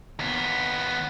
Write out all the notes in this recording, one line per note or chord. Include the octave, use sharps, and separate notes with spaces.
D#2 B3